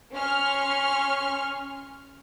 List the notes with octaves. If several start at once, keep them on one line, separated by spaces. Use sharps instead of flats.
C#4 C6 C#6 F6